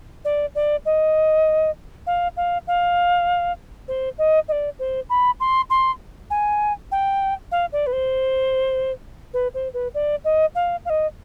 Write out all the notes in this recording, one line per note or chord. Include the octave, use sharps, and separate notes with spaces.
D5
D5
D#5
F5
F5
F5
C5
D#5
D#5
D5
C5
B5
C6
C6
G#5
G5
F5
D5
B4
C5
B4
C5
B4
D5
D#5
F5
F5
D#5